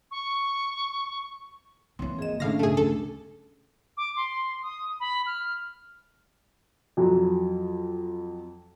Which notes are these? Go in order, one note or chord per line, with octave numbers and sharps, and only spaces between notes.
C#6
E3 A#3 C4 C#5
G#1 G#4 D#5 E7
A2 D#3 C#4 D4 F5 A#6
D1 G2 C#3 A3 G#4
A3 A4
D6
C6
D#6
B5
F6
F2 F#3